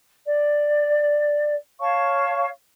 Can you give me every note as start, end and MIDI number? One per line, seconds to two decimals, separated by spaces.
0.25 1.54 74
1.80 2.46 73
1.80 2.46 77
1.80 2.46 81
1.80 2.46 85